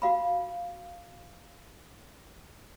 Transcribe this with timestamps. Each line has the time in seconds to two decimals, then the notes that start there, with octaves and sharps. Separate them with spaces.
0.02 F#4 F5 B5